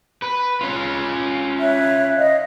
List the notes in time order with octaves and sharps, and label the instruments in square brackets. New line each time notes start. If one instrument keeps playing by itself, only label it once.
[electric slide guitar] B4
C#4 F4
[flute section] C#5 E5 F#6
D#5 F5